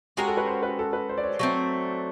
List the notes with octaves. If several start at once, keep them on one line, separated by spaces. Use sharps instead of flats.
G#3 C#4 F#4 G4 A#4
A4
B4
C5
B4
A4
B4
C5
D5
C#5
F#3 A3 C4